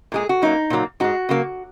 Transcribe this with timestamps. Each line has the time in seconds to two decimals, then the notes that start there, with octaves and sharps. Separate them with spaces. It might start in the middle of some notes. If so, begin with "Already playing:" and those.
0.12 A#2 G#3 G#4
0.29 F#4
0.42 F#2 F#3 A#3 D#4
0.70 A#2 F#3 A#3
1.00 G#2 G#3 F#4
1.29 C#3 F#3 A#3